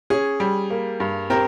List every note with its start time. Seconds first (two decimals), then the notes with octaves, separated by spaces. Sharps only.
0.10 C#4 G#4
0.40 G3
0.70 A#3
1.00 G2
1.30 C4 G4 A#4